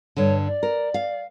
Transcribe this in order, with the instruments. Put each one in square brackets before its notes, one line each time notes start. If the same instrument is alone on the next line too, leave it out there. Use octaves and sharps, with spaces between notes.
[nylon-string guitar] G2 D3 [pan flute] C#5
[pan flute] D5
[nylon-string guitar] A#4
F5